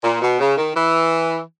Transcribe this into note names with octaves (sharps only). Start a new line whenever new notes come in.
A#2
B2
C#3
D#3
E3